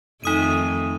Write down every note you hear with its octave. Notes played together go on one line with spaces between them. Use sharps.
F2 D#3 A3 D#4 D#6 D#7